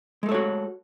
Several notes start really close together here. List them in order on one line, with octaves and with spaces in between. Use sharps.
G#3 A3 A4 C#5 F#4